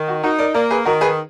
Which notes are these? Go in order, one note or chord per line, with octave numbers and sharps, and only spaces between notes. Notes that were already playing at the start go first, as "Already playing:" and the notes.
Already playing: D#3
F#4
D#4 F#4 A#4
A#4 D5
A#3 A#4 D5
G#4 B4
D#3 F#4 A#4
G#4 B4